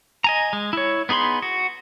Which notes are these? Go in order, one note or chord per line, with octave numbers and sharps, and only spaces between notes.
D#5 G#5 A#5
G#3
E4 C#5
B3 D#4 G#4 B5 C6
F#4